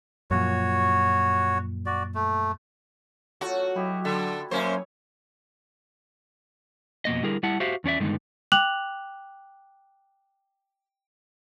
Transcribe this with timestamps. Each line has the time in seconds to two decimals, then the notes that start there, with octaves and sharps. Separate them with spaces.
0.31 F#2 A#2 F3 F#4 C#5
1.86 F#4 D5
2.15 A3
3.41 F#3 A3 F4 F#4
3.76 F#3 E4 G4 D#5
4.05 D3 A4
4.51 F#2 F#3 A#3 C#4 C5 C#5
7.05 F2 B2 A#3 D#5
7.23 D3 G3 E4 G#4 A#4
7.43 G3 E4 F#5 A5
7.60 F#4 G4 C5 E5 F5
7.84 E2 C#4 D5 E5
8.00 G2 D3 D#3 G#3 B3 D#4
8.52 G5 D6 F#6 F7 F#7